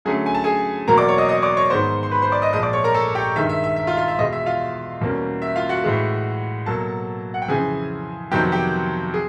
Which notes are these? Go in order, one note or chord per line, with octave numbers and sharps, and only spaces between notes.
D3 F#3 A3 C#4 G#4 G#5
G#5
A5
G#4 G#5
E2 B2 F#3 A#3 A#4 A#5
D5 D6
C#5 C#6
D#5 D#6
D#5 D#6
D5 D6
C#5 C#6
G#2 D#3 G#3 B3 C5 C6
C6
B4 B5
C5 C6
D5 D6
D#5 D#6
A#2 F3 G#3 D#5 D#6
D5 D6
C#5 C#6
A#4 A#5
A4 A5
G4 G5
G2 D#3 G#3 E5
E5
E5
E5
F4 F5
F4 F5
E5
E2 B2 G#3 D#5
E5
F4 F5
E2 B2 G3 A#3 C#4
E5
F4 F5
F#4 F#5
A2 E3 G#3
B2 F#3 A#3 A4 A5
F#5
G5
F2 C#3 E3 G#4 G#5
F2 C3 D#3 F#3 B3 G4 G5
G4 G5
G#4